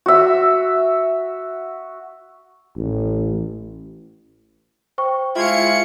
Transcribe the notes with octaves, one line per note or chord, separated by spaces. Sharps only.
F#4 E5
A1
C5 G5 C#6
G#3 E4 F4 G#6 C#7